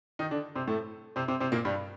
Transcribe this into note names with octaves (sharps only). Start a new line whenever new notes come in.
D#3 D#4
D3 D4
C3 C4
A2 A3
C3 C4
C3 C4
C3 C4
A#2 A#3
G2 G3